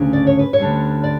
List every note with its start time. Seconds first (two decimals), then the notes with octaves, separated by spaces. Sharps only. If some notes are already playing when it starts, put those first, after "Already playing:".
Already playing: D2 C#3 C#4
0.13 D5
0.27 C#5
0.39 B4
0.53 C#5
0.58 D2 D3 G3 C#4
1.04 D5